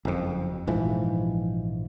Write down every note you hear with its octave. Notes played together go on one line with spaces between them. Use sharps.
F#1 F2
A#1 G#2 E3 F3